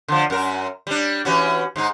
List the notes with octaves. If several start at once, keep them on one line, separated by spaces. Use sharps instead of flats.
D3 F3
F#2 A#4
G3 D4
E3 C#4 F#4
G#2 G#3 D#4